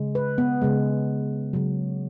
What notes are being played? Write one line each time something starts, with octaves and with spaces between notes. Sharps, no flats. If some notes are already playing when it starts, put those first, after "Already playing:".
Already playing: C#3 G#3
B4
B3
C#3 G#3
C#3 F#3